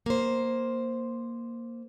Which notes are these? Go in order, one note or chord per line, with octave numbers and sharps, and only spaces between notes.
A#3 C5